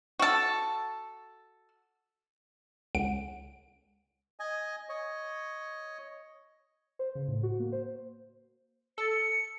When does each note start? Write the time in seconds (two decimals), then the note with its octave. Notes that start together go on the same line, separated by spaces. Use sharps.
0.19 F#4 A4
2.95 C#2 F#5 D7
4.40 D#5 G#5
4.89 C#5 D#5
6.99 C5
7.15 C#3
7.28 A2
7.43 F#4
7.60 A#3
7.72 C5
8.98 A4 C#7